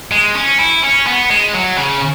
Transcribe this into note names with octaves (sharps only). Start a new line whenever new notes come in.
G#3
C#4
E4
C#4
B3
G#3
F#3
C#3